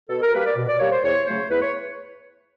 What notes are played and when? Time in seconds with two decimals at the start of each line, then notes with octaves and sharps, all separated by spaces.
0.10 B2 A4
0.22 A#4
0.34 G3 A#3 B4
0.45 D5
0.57 B2
0.69 D5
0.79 G3 A#3 C#5
0.91 C5
1.04 E2 C#5
1.26 C#3 F#3 A3 C5
1.50 E2 B4
1.61 C#5